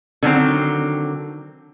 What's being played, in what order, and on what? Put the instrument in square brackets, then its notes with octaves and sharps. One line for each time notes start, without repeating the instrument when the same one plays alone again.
[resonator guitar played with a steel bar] D3 D#3 F#3 C4